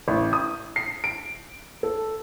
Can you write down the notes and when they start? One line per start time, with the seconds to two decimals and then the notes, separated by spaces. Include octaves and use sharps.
0.08 A1
0.33 D#6
0.76 C7
1.04 D7
1.83 A4